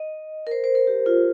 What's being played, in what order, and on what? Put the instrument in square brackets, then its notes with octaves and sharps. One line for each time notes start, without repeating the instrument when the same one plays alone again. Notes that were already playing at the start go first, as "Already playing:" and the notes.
Already playing: [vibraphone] D#5
A#4
C5
C5
A#4
G4
F4